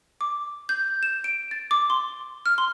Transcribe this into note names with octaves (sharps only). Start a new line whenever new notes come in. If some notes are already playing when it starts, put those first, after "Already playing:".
D6
G6
E7
D7
A6
D6
C6
F6
C6